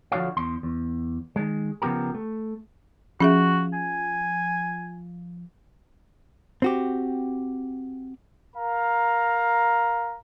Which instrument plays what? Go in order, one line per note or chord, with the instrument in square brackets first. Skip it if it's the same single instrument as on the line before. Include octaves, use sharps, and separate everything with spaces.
[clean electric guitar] D3 F3 F4 F#4 C#5 F5
E2 C6
E2
D#3 G#3
C#3 F3 B3 G4 A#4
A3
[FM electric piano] F3 [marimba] C#4 G#4 E5 [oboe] F#4
[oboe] G#5
[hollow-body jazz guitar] C4 F#4 G4
[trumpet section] A#4 F5 A#5